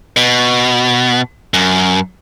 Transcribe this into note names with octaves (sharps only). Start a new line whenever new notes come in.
B2
F#2